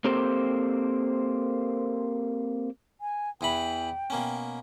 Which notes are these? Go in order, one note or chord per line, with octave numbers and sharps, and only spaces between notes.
A#3 C4 G4 A4 C5
G#5
E2 E3 G5 B5
B2 A#3 C#4